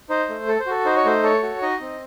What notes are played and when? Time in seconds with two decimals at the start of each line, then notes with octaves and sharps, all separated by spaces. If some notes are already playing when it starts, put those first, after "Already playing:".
0.10 D#4 C5
0.29 A3
0.48 A4
0.60 C5
0.66 F#4 A4
0.85 D#4 C5
0.96 C#5
1.05 A3 C5
1.24 A4 C#5
1.43 F#4
1.62 D#4 D#5
1.81 C4